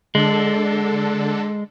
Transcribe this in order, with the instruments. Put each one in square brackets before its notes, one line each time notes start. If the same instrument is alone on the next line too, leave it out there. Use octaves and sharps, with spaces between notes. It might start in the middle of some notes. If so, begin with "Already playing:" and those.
[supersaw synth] D3 D4 A4 [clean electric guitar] G#3